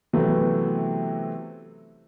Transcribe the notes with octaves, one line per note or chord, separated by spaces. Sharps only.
C3 E3 F#3 A3 B3